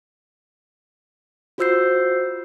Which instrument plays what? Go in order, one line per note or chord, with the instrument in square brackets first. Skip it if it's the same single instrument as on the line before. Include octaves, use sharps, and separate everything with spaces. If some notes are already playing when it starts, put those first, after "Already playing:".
[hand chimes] F4 F#4 C5 E6 G6 C7